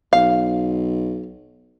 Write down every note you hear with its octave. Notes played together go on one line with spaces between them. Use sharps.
B1 F5